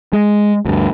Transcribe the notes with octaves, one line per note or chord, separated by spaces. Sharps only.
G#3
D2 G2